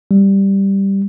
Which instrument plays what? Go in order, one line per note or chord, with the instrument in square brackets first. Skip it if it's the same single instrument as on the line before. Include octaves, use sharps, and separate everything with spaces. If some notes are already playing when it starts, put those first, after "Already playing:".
[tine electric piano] G3